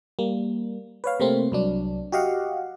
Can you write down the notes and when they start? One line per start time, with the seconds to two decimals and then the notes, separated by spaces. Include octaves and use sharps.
0.19 G3 A#3
1.04 B4 C#5 F5
1.20 C3 A3 A#3 C4
1.52 C2 F#3 D4
2.12 F#4 G4 D#5 F5 F#5